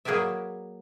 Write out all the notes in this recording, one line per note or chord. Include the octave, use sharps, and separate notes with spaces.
F#3 A#3 G#4 B4 D5 E5